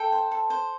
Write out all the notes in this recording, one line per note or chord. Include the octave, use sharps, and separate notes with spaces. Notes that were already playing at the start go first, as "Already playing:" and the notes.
Already playing: A4 G5
C5
A4
C5